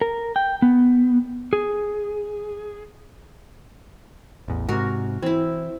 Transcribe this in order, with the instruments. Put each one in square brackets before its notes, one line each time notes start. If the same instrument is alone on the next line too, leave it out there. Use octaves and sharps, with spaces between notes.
[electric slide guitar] A#4
G5
B3
G#4
[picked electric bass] A1 E2
[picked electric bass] G#2 C3 [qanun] F#4 A#4
[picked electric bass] E3 [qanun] C4 E4